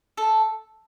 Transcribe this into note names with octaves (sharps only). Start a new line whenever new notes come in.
A4